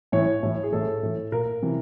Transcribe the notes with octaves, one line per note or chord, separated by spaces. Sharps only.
A2 E3 C#5
A2 E3
G#4
A2 E3 A4
A2 E3
A#2 A#4
C3 E3